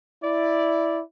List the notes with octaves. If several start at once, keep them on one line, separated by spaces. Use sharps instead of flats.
E4 D5